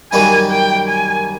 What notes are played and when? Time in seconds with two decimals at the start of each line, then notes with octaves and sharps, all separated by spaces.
0.12 F#2 D#3 G3 A#3 D#4 G#5
0.51 G5
0.88 G#5